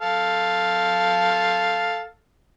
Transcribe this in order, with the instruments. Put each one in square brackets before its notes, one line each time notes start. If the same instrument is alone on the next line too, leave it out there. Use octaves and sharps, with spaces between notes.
[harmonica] A4 F5